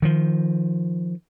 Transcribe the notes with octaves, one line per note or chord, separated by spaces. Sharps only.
D#3 F3